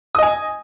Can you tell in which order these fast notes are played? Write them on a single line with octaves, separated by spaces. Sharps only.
D#6 D#5 G#5